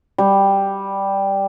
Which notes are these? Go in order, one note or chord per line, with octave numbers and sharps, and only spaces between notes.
G3